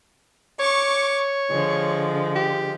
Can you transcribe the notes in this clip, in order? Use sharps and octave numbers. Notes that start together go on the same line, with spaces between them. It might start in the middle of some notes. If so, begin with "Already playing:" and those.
C#5 C#6 D6
D3 F3 G#3
G4